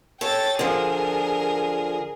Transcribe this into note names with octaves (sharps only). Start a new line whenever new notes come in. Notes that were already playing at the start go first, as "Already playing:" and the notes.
A4 C#5 G5 A6
D3 F3 G#4 A#4